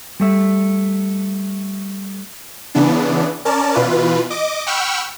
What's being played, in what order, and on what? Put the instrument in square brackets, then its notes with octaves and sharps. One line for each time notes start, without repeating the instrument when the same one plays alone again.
[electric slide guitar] G3 A3 E5
[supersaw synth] C#3 E3 B3 D4
C#4 A#4 D5 A5
B2 E3 F4 B4
D#5 D6
F#5 G5 B5 C#6 E6 F6